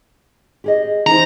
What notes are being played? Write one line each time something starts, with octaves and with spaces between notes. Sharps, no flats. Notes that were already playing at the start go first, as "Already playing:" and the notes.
G4 G#4 D#5
E3 D#4 C5 A#5